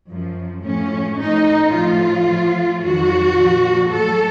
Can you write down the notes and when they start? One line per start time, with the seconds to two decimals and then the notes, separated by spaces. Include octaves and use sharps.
0.08 F#2 F3
0.63 A2 F3 C#4
1.18 A2 F3 D#4
1.72 A2 F3 F4
2.27 A2 F3
2.82 F2 D#3 F#3 F#4
3.35 A#2 F3
3.90 A2 F#3 A4